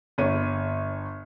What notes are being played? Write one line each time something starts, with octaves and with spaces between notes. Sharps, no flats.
G1 C#5 D#7